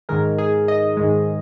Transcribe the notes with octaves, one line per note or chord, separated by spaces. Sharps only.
G#2 D#3 G#3 A#4
G#4
D#5
G#2 D#3 G#3